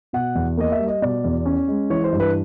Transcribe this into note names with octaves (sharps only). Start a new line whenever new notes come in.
B2 F#5
E2
A#3 D#5
E5
G3
D#5
B2 D5
E2
C#4
G#3
E3 C#5
C5
G2
B4